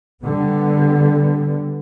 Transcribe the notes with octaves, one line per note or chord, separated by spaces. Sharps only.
D3 G3 B3